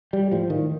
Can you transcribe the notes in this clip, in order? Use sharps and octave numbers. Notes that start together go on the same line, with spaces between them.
G3
A2 F3
D#3